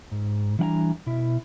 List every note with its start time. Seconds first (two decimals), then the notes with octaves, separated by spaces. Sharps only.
0.11 G#2
0.59 E3 G3 D4 F#5 G#5 A#5
1.06 B2 E4 E5